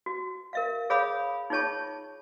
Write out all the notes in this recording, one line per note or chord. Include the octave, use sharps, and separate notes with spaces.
F#4
A#4 E5 F5
G#4 C#5 F5 B5 D#6
D#4 F4 G#4 C#5 A5 C#6